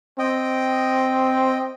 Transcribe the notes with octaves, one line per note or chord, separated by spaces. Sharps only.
C4 D#5 G5